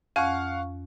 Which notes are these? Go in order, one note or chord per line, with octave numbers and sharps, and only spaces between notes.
F2 C#4 F5 F#5 C#6